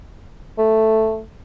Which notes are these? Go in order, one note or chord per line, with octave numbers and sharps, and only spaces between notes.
A3